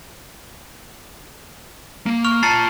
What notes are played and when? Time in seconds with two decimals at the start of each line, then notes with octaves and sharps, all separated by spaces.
2.06 A#3
2.25 C#6 F6 F7
2.43 F4 A5 A#5 A6 C7